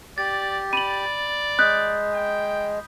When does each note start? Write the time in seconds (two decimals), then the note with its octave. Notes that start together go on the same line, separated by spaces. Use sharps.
0.18 G4 D5 A6
0.73 D5 B5 D#7 F#7
1.59 G#3 D#6 F#6 G6 B6
2.14 G5